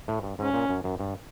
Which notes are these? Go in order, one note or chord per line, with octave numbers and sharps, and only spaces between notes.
A2
G2
G#2 C#4
A#2
F#2
F#2
G2